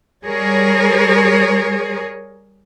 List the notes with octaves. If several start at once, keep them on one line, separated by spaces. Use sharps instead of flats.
G3 G#4 A#4 C#5